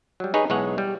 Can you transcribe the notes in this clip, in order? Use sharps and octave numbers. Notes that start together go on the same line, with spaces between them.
F#3 G3
D#4 G#4 B4 C#5
B1 E3 G#3 C#5 D#5 F#5
G3